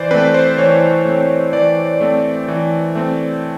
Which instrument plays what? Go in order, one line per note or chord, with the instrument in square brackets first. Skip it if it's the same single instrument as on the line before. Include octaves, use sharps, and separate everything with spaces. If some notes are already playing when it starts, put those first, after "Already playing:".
Already playing: [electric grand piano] E3 C5 D5
A3 C4 B4
C5
E3 C#5
A3 C4
E3 D5
A3 C4
E3
A3 C4